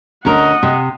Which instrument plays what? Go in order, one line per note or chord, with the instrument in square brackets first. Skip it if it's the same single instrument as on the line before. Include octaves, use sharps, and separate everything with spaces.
[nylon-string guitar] D2 C#4 A#4 [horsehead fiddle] D#5 F#5
[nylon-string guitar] C3